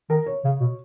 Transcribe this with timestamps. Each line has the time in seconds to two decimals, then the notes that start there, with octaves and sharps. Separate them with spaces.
0.10 D#3 A#4
0.26 C#5
0.45 C#3
0.60 B2